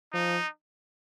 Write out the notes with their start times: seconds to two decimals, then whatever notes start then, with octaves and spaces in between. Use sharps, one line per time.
0.13 F3 D#4